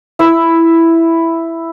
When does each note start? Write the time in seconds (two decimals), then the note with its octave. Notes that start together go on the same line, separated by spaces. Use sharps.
0.19 E4 E6